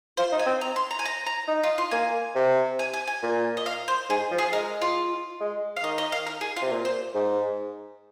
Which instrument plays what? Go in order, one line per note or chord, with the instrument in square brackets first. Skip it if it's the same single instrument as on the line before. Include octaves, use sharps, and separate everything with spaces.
[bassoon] F4 [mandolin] C5
[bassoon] D#4
[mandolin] G#5
[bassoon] C4
[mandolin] A#5
C6
A#5
G#5
A#5
A#5
[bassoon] D#4
[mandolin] F4
F4
[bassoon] A#3 [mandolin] G#5
[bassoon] C3
[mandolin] G#5
G#5
G#5
[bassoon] A#2
[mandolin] D#5
F5
C5
[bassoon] G#2 [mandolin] G#4
[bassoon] F3
[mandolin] G#4
[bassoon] G#3 [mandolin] A#4
[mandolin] F4
[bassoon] G#3
[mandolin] F5
[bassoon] D#3 [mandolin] D#5
[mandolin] D#5
F5
A#4
G#4
F4
[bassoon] C3
A#2
[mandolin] C5
[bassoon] G#2